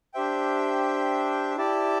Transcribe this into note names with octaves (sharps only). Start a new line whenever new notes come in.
D4 G4 C5 E5 G5
E4 G4 D5 A5